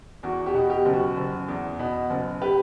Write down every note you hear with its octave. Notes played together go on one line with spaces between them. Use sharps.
E2 F#4
G4
B2
G4
F#1
F#4
F#1
E2
B2
F#1
G4 B4